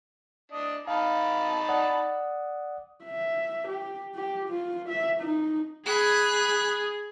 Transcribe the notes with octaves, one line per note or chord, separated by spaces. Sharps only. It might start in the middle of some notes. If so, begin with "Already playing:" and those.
D4 D#5
D#4 F5 A5 B5
D5 F#5 D#6
E5
G4
G4
F4
E5
D#4
G#4 B5 F#6